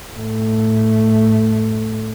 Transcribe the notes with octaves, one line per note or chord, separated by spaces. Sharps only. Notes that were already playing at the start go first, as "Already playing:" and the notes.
A2 A3